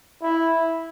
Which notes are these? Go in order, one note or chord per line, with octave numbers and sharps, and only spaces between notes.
E4